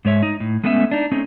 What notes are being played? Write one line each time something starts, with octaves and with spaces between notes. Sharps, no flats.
G#2 G#3 C#5 E5
D#4
A2
G#3 A3 B3 C#4 D5 E5
D4 D#4
A3 C4 C#4 D#4